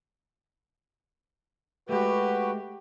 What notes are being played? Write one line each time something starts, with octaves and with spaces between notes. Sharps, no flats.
G#3 A3 F#4 G4 B4